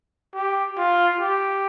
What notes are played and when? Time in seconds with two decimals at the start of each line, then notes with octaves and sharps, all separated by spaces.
0.34 G4
0.78 F4
1.20 G4